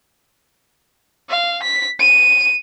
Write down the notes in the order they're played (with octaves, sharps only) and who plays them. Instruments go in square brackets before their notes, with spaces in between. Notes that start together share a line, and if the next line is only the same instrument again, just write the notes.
[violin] F5
B6
D#7